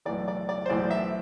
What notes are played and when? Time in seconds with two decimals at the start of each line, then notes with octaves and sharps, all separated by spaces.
0.05 B1 A2 E3 D5
0.28 D5
0.49 D5
0.66 C5
0.69 B1 A2 E3 D5
0.91 E5